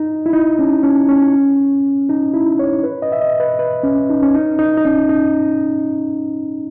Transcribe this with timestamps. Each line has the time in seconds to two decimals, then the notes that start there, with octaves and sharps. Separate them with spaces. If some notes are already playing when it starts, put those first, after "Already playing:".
Already playing: D#4
0.26 E4
0.33 D#4
0.59 C#4
0.83 C#4
1.09 C#4
2.09 D#4
2.34 E4
2.59 C#5
2.83 B4
3.02 D#5
3.12 E5
3.21 D#5
3.40 B4
3.59 B4
3.83 C#4
4.10 D#4
4.23 C#4
4.35 D#4
4.59 D#4
4.77 D#4
4.85 C#4
5.09 D#4